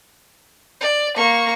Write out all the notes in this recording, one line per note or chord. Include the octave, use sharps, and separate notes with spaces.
D5
A#3 C#6